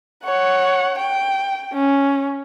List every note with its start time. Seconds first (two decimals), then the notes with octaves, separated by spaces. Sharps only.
0.24 C#5 F#5
0.98 G5
1.73 C#4